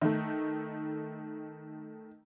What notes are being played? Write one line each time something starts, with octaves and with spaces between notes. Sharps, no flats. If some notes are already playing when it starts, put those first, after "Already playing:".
D#3 A3